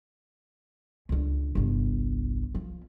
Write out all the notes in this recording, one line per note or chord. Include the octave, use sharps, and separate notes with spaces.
C#2 D3
G1 C2
F3